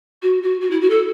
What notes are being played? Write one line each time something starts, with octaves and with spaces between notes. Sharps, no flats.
F#4
F#4
F#4
E4
F#4
A4